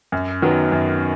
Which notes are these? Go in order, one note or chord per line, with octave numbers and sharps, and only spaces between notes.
F#2
D#3 F#3 B3
F#2